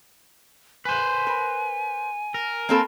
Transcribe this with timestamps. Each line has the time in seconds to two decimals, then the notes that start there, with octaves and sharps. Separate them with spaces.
0.85 B4 C5 G#5
1.27 A#4
2.34 A#4
2.69 A#3 C4 A4